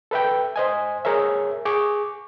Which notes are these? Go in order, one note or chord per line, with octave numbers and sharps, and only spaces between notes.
A4 B4 E5 G5
C5 D#5 G#5
G#4 A#4 C#5 E5
G#4 C#6 D6